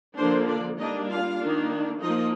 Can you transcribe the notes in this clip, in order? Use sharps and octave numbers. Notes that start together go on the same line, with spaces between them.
D3 F3 A#3 C4 D4 C5
D4 D5
G3 A#3 D4 D#4 D#5
F4 F5
D#3 A#3 D4
F3 A#3 D#4 D#5